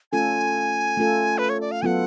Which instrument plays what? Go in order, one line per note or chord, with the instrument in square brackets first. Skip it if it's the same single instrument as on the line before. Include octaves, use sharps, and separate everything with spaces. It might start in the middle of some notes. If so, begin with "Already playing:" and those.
[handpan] A3 C#4 F4 A4 [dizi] G#5
[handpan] A3 C#4 F4 A4
[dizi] B4
C#5
D5
F5
[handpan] F#3 B3 F4 A4 [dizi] F#5 G#5